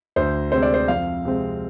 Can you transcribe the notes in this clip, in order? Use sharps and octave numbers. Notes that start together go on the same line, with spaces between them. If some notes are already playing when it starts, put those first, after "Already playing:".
D2 C5
C3 G#3 C4 C5
D5
C5
F2 F5
C3 G#3 C4